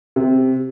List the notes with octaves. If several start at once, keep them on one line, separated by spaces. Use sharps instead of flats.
C3